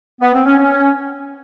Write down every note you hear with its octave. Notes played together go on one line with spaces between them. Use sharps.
B3
C4
C#4
C#4